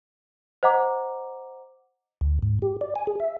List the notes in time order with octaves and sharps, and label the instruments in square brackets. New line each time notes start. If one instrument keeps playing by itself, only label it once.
[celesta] C5 D#5 F#5 A#5 D6
[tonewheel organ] D2
G#2
G4
D5
G#5
G#4
E5